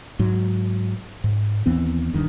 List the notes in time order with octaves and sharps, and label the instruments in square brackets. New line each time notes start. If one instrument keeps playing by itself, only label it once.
[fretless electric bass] G#2 F#3
G#2
D#2 E3 B3 C4
D#1 G2 D#3